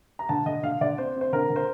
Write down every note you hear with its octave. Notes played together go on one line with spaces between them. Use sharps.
A#5
D3 A5
D3 D#5
D3 F5
D3 D5
C4 C5
C4 C5
D3 A#4
D3
C5